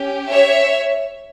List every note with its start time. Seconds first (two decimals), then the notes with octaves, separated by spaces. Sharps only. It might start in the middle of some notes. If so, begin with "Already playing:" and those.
Already playing: C#4 G4
0.31 C#5 E5